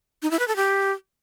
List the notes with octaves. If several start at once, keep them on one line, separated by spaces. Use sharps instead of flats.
D#4
E4
B4
A4
G4